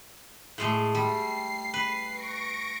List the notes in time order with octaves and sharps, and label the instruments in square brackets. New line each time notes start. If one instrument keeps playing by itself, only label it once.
[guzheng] A2 G#3 A3
[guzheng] G3 [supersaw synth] C7
[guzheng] B4
[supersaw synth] C#6 A#6 D7